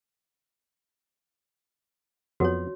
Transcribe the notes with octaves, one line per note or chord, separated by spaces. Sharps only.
F2 F#3 B3 F#4 C#5